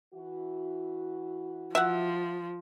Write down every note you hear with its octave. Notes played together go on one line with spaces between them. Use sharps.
E3 E4 F#4
F3 E5 F#5